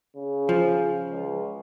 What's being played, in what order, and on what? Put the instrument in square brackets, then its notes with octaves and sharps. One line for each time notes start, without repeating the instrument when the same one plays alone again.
[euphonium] C#3
[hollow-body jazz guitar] F3
[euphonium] C#2